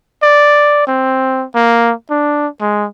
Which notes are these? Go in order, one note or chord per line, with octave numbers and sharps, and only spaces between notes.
D5
C4
A#3
D4
G#3